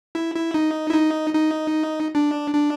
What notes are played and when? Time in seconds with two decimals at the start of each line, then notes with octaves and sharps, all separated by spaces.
0.15 E4
0.35 E4
0.54 D#4
0.90 E4
0.94 D#4
1.34 D#4
2.15 D4
2.54 D4